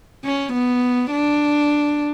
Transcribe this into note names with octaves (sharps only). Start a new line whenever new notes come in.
C#4
B3
D4